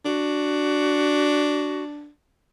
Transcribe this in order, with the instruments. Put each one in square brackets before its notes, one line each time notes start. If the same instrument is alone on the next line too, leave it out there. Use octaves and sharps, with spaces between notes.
[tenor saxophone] D4 [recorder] F#4